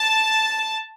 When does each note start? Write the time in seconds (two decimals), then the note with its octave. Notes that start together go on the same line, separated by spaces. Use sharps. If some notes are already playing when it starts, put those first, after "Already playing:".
Already playing: A5